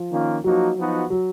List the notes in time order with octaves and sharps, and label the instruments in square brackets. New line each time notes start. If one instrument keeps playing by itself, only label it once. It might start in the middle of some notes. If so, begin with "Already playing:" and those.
Already playing: [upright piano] F3
[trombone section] D#3 A#3 C#4 F4
[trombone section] F3 A#3 D#4 F#4 [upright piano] F#3
[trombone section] F3 B3 D#4 F#4
[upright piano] F#3